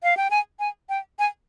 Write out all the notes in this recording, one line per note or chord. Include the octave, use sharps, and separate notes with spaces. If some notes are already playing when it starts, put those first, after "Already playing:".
F5
G5
G#5
G#5
G5
G#5